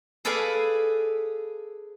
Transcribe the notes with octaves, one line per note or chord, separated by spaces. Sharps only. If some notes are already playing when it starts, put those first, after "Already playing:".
G#4 A4 B4 D5 F5 G#5